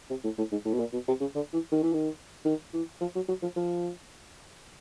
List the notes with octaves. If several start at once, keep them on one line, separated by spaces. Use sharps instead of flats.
C3
A2
A2
G#2
A2
B2
A#2
B2
C3
C#3
D3
E3
D#3
E3
D#3
D#3
E3
F3
F#3
F#3
F3
F3